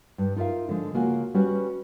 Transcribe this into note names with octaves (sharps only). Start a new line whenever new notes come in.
G2
D#4 F4 A#4 E5 F5
D3 F3 G#3
C#3 A#3 F4 F#4 G#5
G3 C#4 F#4 G4 B4